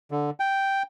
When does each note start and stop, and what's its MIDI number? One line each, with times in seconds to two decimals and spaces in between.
0.11 0.30 50
0.40 0.83 79